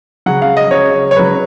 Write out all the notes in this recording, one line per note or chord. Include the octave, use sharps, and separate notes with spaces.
C#3 F#3 F#5
F5
D#5
C#3 F#3 C#5
C#5
C#3 F#3 B4